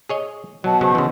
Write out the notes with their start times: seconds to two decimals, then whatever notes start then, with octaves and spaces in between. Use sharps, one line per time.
0.09 G#4 C#5 D#5
0.64 B2 F#3 A5
0.81 C#3 F#3 C#4 C5 C#6
0.95 C#3 E3 C6